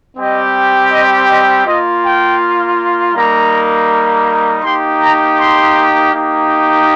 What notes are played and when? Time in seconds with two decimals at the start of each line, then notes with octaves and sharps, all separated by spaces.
0.17 G3 C4 G4 D#5
0.90 D#5
1.28 D#5
1.65 A#3 F4 D#5
2.03 G5
3.14 G3 A#3 D#4 A#5
4.63 A#3 D#4 G4 C6
5.00 A#5
5.37 C6
6.11 A#3 D#4 G4